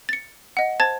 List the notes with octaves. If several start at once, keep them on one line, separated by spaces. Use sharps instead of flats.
A6 C#7
D#5 F#5
C5 A5 G#6 A6